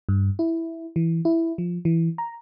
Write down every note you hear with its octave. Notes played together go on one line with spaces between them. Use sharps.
G2
E4
E3
E4
F3
E3
A#5